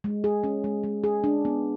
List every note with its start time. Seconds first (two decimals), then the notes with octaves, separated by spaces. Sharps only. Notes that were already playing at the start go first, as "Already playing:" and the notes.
0.04 G#3
0.24 G#4
0.44 C#4
0.64 G#3
0.84 G#3
1.04 G#4
1.24 D4
1.45 B3